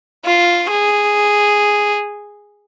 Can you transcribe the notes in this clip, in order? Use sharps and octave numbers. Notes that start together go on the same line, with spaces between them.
F4
G#4